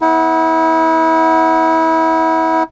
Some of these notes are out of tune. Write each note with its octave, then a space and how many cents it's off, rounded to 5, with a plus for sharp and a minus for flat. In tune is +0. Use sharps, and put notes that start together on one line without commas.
B3 +0 E4 -30 F#5 +0